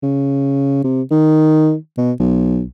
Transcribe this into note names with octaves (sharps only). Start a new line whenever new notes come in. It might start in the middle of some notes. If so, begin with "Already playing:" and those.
C#3
C3
D#3
B2
B1